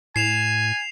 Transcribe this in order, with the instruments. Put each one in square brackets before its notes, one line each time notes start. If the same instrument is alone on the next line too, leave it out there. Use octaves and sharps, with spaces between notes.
[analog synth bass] A2 [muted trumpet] G#5 [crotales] C7 E7 F7